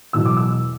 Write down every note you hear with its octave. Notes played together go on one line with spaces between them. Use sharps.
E1 E2 B2 F#3 E6
D6
E6